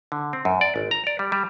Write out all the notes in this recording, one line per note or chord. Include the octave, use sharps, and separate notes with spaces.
D3
C4
F#2
D5
G#1
A#5
D5
G3
G3